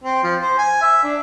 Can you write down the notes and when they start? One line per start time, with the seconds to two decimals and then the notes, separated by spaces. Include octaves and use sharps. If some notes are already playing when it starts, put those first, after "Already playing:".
0.04 C4
0.23 F3
0.40 C5
0.58 G#5
0.82 E5
1.04 D4